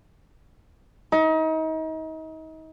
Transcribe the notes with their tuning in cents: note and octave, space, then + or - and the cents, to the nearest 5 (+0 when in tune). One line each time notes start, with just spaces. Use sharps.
D#4 +35